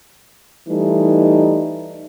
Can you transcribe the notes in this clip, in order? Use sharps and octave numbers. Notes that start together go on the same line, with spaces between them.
E3 G3 A3 D#4